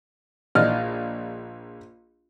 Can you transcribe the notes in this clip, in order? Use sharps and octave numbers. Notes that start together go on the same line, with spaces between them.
A#1 D5 D#5 F6